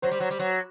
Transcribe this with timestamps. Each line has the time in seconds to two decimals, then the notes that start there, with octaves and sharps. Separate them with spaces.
0.02 F#3 C5
0.11 G3
0.20 F#3
0.31 G3
0.39 F#3